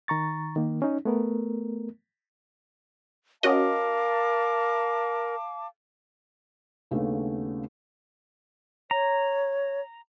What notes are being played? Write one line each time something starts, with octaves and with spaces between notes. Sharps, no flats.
D#3 A#5 C#6 A6
D#3 A#3
C#4 D#4
A3 B3 A#4
C#4 F#4 A#4 D#5 F5 A5 D6
D#2 C#3 A3 B3 C#4 D4
C#5 A#5